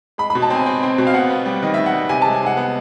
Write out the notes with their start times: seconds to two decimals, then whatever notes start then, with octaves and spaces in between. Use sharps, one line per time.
0.18 G#3 B5
0.30 B5
0.35 B2
0.42 A5
0.50 C4 G#5
0.66 C4 G5
0.83 C4
0.98 B2
1.07 F5
1.14 B3 F#5
1.30 B3
1.46 G3
1.63 D#3 D#5
1.74 E5
1.78 D#3
1.86 F#5
1.94 G3
2.09 C3 G#5
2.22 A5
2.25 G#3
2.34 G#5
2.42 G#3 F#5
2.57 B3